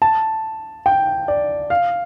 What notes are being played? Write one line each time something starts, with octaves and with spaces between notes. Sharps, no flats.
A5
G5
D5
F5